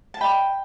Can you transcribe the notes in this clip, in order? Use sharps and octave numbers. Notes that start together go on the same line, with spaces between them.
A5
D#5 G5 B5